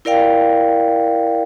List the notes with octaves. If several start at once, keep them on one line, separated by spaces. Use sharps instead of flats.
E4 A#4 D5 F5 G5